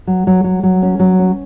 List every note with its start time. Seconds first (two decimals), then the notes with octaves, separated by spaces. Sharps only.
0.07 F#3
0.27 F#3
0.44 F#3
0.63 F#3
0.82 C#4
0.99 F#3
1.19 C#4